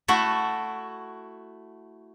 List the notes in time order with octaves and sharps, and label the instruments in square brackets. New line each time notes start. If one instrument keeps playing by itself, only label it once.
[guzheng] A3 E4 F#4